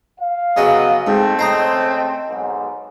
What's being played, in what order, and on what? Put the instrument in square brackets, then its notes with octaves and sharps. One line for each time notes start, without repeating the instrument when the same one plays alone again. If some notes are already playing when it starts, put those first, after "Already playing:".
[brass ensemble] F5
[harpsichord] C#3 C#4 F#4 [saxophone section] F#3 B3 D#5
[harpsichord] G#2 [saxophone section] A3 C4
[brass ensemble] C#3 D#5 [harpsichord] C5 A#5 D#6
[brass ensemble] B1 G#2